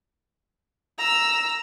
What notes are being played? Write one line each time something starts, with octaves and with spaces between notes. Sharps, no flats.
A#5 E6